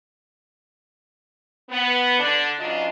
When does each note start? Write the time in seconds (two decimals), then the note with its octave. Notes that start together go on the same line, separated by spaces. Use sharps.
1.69 B3
2.18 D3 D4
2.59 G#2 C#3 F#3 D4 F4 D#5